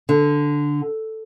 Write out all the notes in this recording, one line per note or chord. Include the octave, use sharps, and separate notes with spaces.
D3